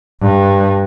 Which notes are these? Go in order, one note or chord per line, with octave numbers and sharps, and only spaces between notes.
G2